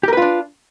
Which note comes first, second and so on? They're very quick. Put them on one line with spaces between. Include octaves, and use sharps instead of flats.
G4 A#4 B4 F4 D4